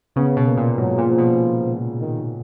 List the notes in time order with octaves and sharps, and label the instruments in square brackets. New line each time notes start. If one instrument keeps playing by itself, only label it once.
[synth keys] C#3 [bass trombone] B3
[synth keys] B2
[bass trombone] A#3
[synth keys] A#2
[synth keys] G#2 [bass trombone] F#3
[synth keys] A#2
[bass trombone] F3
[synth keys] B2
[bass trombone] D#3